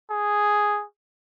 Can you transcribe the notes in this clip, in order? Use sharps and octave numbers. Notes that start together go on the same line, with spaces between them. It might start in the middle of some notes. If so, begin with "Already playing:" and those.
G#4